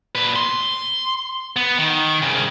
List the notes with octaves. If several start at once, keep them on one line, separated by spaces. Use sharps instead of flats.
A#2 B4
C6
B3
D#3
C2 C#3